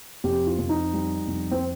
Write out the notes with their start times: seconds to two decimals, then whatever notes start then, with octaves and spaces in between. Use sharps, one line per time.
0.24 F2 G4
0.47 F4
0.59 F2
0.69 D#4
0.93 G3
1.28 F2
1.51 C4